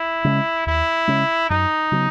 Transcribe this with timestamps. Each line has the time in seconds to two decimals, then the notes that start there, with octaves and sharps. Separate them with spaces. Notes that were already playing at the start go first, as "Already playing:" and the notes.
Already playing: E4
0.24 C#3 G#3 C#4
0.66 D#2 E4
1.07 C#3 G#3 C#4
1.49 F#2 D#4
1.92 C#3 F#3 B3